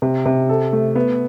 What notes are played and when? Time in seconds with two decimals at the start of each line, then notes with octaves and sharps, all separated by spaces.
0.02 C3
0.26 C3
0.49 A4
0.73 A3
0.95 B3